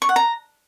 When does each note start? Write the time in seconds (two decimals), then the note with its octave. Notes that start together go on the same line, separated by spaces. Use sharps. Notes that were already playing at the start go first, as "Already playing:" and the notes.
0.02 C#6
0.09 F#5
0.16 A#5